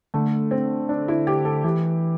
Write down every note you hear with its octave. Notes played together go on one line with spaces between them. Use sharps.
D3 A3
C4
D4
E4
G4
A4
E3 G4